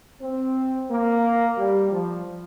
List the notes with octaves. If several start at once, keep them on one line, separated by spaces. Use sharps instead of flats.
C4
A#3
G3
F3